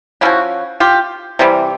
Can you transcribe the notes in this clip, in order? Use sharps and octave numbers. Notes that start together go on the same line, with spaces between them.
F3 A#3 C#4 E4 F#4
F4 G4
C3 E3 G3